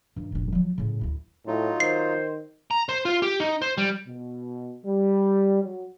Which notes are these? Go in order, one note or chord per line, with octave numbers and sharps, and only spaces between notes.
G2 D#3
F1 A#1
F3 F#3
A2 C#3
D2 E4
A2 F#3 D#4 F4
D#3 C5 C7
A#5
C5
F4
G4
D#4
C5
G3
B2
G3
F#3